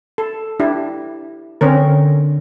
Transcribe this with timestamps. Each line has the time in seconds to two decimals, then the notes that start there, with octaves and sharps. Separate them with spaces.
0.18 A4
0.60 D4 E4 G4
1.61 D3 C4 C#4 A#4